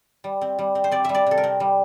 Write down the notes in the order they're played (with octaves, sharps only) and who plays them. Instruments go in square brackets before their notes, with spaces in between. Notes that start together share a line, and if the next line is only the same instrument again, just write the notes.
[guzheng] G3
C4
G3
C4
C5
C4 D5
G3 E5
D5
C3 A4
A#4
C4
G3